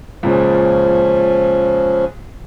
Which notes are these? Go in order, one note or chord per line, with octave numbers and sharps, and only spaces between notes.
C#2 A#2 C#3 F3 C#4